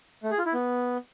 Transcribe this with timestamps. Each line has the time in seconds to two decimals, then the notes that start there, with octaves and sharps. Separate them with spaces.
0.23 A3
0.31 G#4
0.38 F4
0.46 E4
0.54 B3